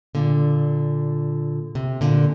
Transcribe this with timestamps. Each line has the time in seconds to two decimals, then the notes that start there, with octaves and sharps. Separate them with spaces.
0.15 A#2 D3
1.75 C3
2.01 A#2 D3